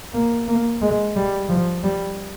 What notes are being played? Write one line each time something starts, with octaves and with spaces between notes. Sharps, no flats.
A#3
A#3
G#3
G3
F3
G3